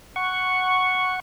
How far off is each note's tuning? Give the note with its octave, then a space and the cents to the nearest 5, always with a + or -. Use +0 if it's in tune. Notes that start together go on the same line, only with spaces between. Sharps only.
F#5 +0 C#6 +0